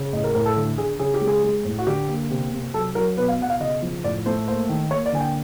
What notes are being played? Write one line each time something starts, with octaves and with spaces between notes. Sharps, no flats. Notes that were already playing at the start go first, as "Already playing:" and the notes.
Already playing: C#3
A2 D#5
A#4
A2 A#4
A4
D3 A4
D3 G#4
C#3 G#4
G4
G#3
G#4
G#3
A2
F#4
D3 G4
A#3
C3
C3
F#3 A4
F#3 A#4
B2 B4
F5
B2 F#5
F5
C#3 D#5
F3
A2 D5
A3 C5
A#3 C5
D#3
A#3 C#5
D5
D3 G#5
G5